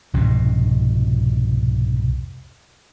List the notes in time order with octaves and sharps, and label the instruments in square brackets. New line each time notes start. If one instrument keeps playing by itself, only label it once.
[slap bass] C2 F2 G#2 B2